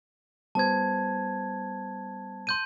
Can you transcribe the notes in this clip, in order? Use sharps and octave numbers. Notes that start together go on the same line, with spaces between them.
G3 B3 C5 A5 G#6
C6 G6 D#7